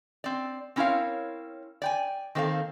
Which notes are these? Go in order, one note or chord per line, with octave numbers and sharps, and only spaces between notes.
C4 D5
C4 C#4 E4 A#4 C#5 F5
D5 G5 G#5
D#3 A#3 C4 A4 F5